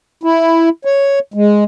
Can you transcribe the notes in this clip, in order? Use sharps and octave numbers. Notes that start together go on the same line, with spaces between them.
E4
C#5
G#3